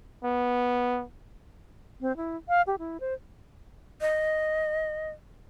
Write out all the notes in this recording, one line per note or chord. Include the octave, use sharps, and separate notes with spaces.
B3
C4
E4
F5
G4
E4
C5
D#5